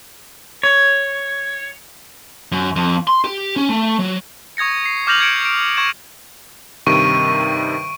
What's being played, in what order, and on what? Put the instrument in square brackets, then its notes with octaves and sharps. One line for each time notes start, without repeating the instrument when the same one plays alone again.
[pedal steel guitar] C#5
[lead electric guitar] F#2
F2
C6
G4
C#4
A3
F#3
[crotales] C#6 D#6 G#6 A#6 C#7
C7
D6 F6 G6 A#6 F7 F#7
F6 G#6 C#7 D7
D7
C#6 G#6 E7
[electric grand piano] G2 C3 D#3 [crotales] C#6 D7 D#7